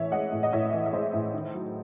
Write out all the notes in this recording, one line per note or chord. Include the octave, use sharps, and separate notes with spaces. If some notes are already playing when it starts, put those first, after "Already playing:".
Already playing: A2 E3 C#5 E5
G#3 D#5 F#5
A2
D#5
A2 C#5 E5
E3
E5
G#3 C5 D#5
A2
D#3
F#3